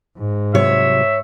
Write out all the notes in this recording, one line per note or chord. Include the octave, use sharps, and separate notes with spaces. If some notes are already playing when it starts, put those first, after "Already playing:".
G#2
C2 C3 F#3 C#5 E5